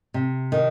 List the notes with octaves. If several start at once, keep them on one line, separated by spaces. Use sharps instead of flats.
C3
D#3